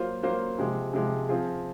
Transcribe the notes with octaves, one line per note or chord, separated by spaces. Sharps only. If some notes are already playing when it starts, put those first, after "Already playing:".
Already playing: F#3 A#3 F4 C5
F#3 A#3 F4 C5
C3 F3 G#3
C3 F3 G#3
F3 C4 F4 G#4